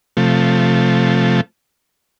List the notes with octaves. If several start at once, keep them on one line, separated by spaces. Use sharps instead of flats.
C3 F3 A3